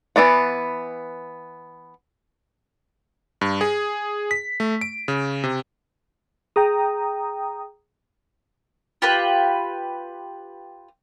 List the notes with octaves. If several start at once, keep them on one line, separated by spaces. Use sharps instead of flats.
E3 B3 D5 F#5
G2
G#4
B6
A3
D7
C#3
C3
G#4 G5 A#5 D#6
F4 G4 B4